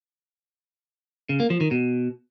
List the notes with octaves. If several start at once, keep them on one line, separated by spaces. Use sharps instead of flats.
C#3
A#3
F3
D#3
B2